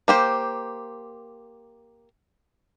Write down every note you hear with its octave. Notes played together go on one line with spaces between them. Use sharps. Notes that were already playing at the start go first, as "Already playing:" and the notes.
A#3 G4 C5